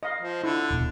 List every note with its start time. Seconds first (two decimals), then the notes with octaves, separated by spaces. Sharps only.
0.03 D#5 F5
0.21 F3
0.44 D3 E4
0.70 D#1 B2